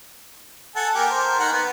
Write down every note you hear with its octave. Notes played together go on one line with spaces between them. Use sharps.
A4 F#5 G#5
A#3 G4 G#5
A#4 C5
D#3 F#5 A#5
B3